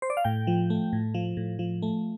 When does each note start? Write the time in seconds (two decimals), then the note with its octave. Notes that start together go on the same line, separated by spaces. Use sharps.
0.02 C5
0.10 D5
0.17 F5
0.25 A2 G5
0.47 F3
0.70 A3
0.93 A2
1.14 F3
1.37 A2
1.59 F3
1.82 A3